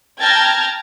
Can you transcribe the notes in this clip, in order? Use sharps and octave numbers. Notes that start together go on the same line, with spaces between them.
G5 A5 A#5 F6 G#6 A6